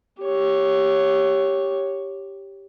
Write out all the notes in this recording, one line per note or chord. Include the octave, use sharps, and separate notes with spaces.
G4 C#5